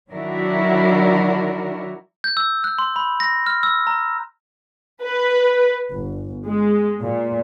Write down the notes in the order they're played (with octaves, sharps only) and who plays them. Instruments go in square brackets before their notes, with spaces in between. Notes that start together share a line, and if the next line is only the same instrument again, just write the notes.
[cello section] D#3 F#3 D4 E4 F#4 A#4
[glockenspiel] G6
E6
F#6
C6
B5
A#6
F6
E6
A#5
[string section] B4
G1
G#3
A#2